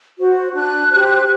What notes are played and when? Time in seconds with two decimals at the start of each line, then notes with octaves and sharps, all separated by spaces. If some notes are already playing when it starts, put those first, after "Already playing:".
0.18 F#4 C5
0.54 D4 F#6
0.91 G4 C5 F#6